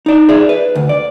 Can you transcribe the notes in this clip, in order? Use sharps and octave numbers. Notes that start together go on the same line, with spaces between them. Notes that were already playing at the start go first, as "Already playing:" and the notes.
D#4 D5
G#4 D5 E5
B4
D2
D5